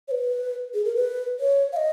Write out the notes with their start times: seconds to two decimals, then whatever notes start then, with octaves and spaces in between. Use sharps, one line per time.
0.08 C#5
0.11 B4
0.74 G#4
0.85 A#4
0.95 B4
1.40 C#5
1.73 F5
1.77 D#5